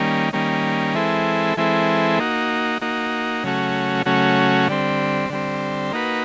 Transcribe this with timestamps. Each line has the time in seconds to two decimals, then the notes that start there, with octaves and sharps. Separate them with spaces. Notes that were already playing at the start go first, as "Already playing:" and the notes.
Already playing: D#3 G3 A#3 C#4
0.33 D#3 G3 A#3 C#4
0.95 E3 G#3 C4 E4 A4
1.57 E3 G#3 C4 E4 A4
2.19 A#3 D#4 F#4
2.82 A#3 D#4 F#4
3.44 C#3 F#3 A3 C#4 F#4
4.06 C#3 F#3 A3 C#4 F#4
4.68 D3 G3 C4
5.30 D3 G3 C4
5.92 A#3 D#4 F#4 B4